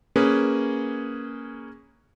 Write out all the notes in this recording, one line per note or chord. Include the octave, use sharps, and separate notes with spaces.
A#3 C#4 G#4 B4